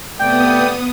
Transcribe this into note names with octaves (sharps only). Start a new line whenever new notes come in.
C3 A3 B3 D5 G5 D#6